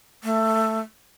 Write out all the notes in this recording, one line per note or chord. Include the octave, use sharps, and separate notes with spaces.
A3